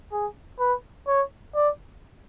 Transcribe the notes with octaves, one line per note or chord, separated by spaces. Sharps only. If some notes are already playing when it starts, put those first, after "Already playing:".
G#4
B4
C#5
D5